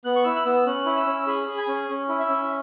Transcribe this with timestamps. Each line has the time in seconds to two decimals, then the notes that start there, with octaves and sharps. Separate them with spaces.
0.05 B3 F#6
0.16 C#6
0.24 E4 E6
0.36 F#6
0.45 B3 E6
0.66 C#4 F#6
0.86 E4
0.97 E6
1.06 C#4
1.27 G#4 B5
1.47 G#4
1.58 G#5
1.68 C#4
1.89 C#4
2.09 E4
2.19 E5
2.29 C#4